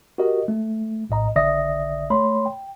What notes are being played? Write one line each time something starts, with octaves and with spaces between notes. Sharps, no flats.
F#4 G4 A#4 D#5
A3
A#1 A2 D#5 A#5
A#1 D3 D5 E5 D#6 A#6
A3 C#5 B5 C6
G5